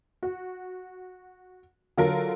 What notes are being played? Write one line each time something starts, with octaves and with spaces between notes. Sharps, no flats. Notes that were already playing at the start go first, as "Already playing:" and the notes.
F#4
D3 F#3 F4 A4 A#4